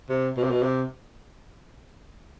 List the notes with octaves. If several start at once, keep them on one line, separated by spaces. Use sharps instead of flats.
C3
B2
C3
B2
C3